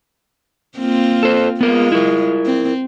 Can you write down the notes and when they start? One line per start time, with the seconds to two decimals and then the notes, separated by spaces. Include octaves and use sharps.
0.78 A#3 C4 F4
1.23 A4 C5
1.61 G#3 B3 F4 A#4
1.92 E4 A#4
2.45 C4